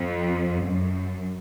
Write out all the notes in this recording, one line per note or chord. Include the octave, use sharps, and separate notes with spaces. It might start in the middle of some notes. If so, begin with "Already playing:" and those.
Already playing: F2
F#2